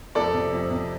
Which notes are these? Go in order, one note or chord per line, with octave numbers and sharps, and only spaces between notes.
F2 A4 D5
C3
F2
C3